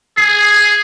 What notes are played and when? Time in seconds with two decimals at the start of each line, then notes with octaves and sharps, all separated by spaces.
0.17 G#4 C7